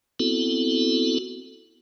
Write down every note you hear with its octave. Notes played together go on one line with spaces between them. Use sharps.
B3 C4 E4 F#4 A4